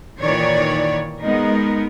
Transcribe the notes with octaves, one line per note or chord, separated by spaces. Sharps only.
A#2 D#3 E3 C#5 D5
G#3 B3 D#4 A#4